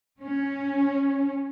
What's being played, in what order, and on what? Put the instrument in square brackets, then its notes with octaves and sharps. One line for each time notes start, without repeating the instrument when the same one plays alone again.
[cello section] C#4